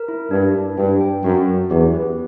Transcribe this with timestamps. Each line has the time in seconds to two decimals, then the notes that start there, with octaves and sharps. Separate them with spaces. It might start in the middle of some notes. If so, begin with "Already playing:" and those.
Already playing: A#4
0.08 E4
0.31 G2 D4
0.54 D4
0.78 G2 G5
1.01 G5
1.24 F#2 F#4
1.47 F#4
1.70 E2 G4
1.94 B4